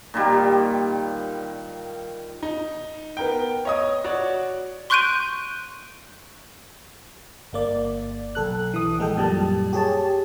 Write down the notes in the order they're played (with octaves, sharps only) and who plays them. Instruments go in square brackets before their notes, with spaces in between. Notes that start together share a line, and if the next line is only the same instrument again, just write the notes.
[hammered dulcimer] A#2 D#3 G3
[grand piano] D#4
B3 A#4 G5
C#5 D#5 D#6
F#4 C#5 D5
[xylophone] C6 C#6 F#6 G6 D7 D#7
[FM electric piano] G1 A#3 D5
B1 A4 F#6
E3 D#6
A#1 G#3 A4 G5
F#2 A#2 G3 A5
G4 G#4 C#5 A5